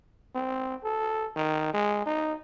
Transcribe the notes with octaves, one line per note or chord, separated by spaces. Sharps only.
C4
A4
D#3
G#3
D#4